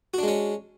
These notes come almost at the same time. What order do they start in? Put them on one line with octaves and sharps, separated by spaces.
F#4 D4 G#3 C#4